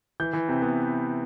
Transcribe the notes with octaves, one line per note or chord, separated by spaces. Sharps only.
E3 G6
E3
C3
B3